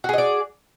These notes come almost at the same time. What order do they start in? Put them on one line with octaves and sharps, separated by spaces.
F#4 G#4 D#5 D5